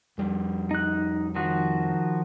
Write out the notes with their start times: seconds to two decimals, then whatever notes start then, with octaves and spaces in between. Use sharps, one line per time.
0.18 F2 G3
0.71 D#4 F#6
1.35 D#3 F3 F#4